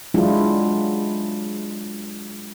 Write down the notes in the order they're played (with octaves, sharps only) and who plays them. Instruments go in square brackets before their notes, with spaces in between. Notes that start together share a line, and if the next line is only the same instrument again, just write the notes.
[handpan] F#3 G#3 D4 E4 F4